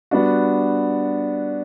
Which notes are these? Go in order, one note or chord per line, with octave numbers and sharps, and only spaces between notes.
G3 B3 D4 F#4